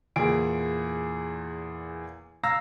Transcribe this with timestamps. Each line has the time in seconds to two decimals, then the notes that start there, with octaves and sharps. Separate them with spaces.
0.16 E2 A#2 G#4 D7
2.43 F5 A#5 E6 A#6